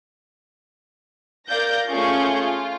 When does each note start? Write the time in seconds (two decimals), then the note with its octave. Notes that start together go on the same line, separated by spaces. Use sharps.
1.48 A#4 D5 F5 G6 A#6
1.90 A3 C#4 F4 G#4 C#6 G6
2.37 F4